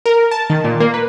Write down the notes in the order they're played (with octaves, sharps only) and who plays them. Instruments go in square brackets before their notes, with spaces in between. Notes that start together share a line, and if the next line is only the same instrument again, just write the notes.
[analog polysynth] A#4
A5
D#3
A#2
A#3
B4